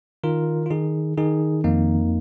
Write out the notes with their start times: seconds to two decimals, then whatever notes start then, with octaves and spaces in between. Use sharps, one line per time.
0.24 D#3 F4 A#4
0.66 F4
0.70 D#3 D#4 G#4
1.17 D#3 D#4 G#4
1.64 F2 A#3 D#4